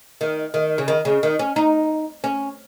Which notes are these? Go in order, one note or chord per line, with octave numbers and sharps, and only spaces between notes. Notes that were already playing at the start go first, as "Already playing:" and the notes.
D#3
D#3
C#3
D#3
C#3
D#3
C#4
D#4
C#4